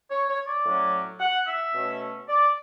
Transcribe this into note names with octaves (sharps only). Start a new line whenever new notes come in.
C#5
C#5
D5
A2 F#3 C#4
F#5
E5
B2 A3 C#4
D5